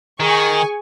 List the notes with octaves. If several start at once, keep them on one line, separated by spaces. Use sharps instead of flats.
D#3 G#4 G#5 C#6